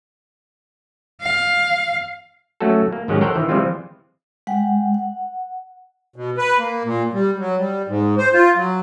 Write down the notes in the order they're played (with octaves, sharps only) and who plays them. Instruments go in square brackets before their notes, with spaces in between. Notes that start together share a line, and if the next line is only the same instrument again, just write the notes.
[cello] F5
[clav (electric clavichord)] F#3 A3 C#4 F#4 A4
A#3
G#2 D#3 F#3 G#3 C#4 G4
A4 A#4 C5 C#5 F#5 G5
D#3 E3
E3 F3 G3 G#3 C4 F4
[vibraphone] G#3 F#5 G5
F#5
[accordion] B2
B4
A#3
A#2
G3
F#3
G3
G#2
C5
F4
F#3